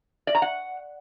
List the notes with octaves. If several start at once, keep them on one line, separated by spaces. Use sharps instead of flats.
D5
A#5
F#5